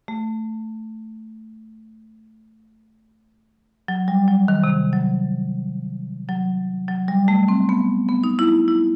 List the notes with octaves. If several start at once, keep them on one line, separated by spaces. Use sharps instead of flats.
A3
F#3
G3
F#3
D#3
C3
F#3
F#3
F#3
G3
A3
C4
B3
B3
D#4
E4
E4